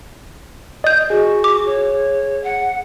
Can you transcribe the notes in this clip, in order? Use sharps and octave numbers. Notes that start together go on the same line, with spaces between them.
D5 D#5 G6
F#4 G#4
D6
C#5
F#5